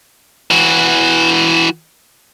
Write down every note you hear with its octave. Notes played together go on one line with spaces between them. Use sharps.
E3 F#4